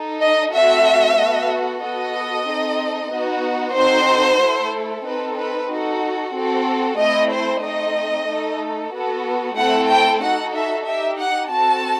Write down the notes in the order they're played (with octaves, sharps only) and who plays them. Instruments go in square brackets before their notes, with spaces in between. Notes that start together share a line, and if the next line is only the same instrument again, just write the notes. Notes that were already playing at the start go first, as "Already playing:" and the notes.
Already playing: [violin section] D#4 A4
D#5
A3 C4 F#4 A4 E5
B3 F#4 A4
B3 F#4 A4 D#5
C4 D#4 A4
B3 D#4 F#4
C4 D#4 F#4 A4 C5
A3 E4 A4
C4 D#4 A4 B4
B4
D#4 F#4 A4
C4 F#4 A4
A3 C4 E4 D#5
C5
A3 C4 D#4 D#5
A3 D#4 A4
B3 F#4 A4
A3 C4 E4 A4 F#5
G5
D#4 F#4 A4 F#5
E5
D#4 G4 E5
F#5
C4 F#4 A4 A5